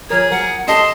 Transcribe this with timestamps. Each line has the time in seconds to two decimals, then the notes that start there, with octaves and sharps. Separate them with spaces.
0.10 F3 G#4 A#4 C#5
0.31 F#3 A#4 F#5
0.68 C#4 G4 A4 D#5 A5 C6